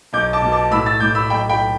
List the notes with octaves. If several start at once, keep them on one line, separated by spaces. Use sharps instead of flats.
B1 D6 G6
A5 D6
B2
A5 D6
A2 B5 E6
E6 A6
A2 D6 G6
B5 E6
B1 G5 B5
G5 B5